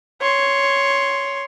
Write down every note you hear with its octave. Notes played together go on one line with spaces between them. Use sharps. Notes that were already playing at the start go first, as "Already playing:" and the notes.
C#5 C6